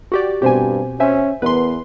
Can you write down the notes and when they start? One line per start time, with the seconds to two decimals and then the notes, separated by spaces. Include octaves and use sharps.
0.12 F#4 G4 D5
0.42 G2 B2 C4 G4 C5 G#5
1.00 C#4 C5 E5 G#5
1.42 E2 B3 A#4 B4 C6